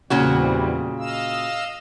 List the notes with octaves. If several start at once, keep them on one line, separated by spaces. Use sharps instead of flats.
E2 A#2 C#3 G3 C4 F#4
D#5 F5 E6